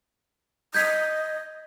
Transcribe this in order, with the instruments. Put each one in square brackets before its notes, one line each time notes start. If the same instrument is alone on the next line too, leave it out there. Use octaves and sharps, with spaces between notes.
[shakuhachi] D#5 [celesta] G6 G#6 B6